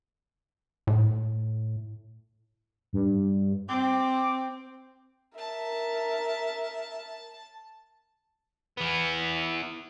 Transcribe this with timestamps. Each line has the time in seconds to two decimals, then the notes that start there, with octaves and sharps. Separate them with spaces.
0.87 A2
2.93 G2
3.69 C4 D6
5.38 A#4 E5 A5
8.77 E3 B3